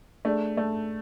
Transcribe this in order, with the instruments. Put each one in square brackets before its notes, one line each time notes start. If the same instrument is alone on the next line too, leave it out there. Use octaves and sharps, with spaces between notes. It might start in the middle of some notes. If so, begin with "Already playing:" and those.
[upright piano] A3 [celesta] D4 G#4 D5
[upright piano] A3